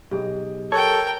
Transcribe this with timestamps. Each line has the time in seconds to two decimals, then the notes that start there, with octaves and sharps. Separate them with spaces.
0.11 B1 G4 G#4 D#5
0.72 A4 A#4 C#5 G5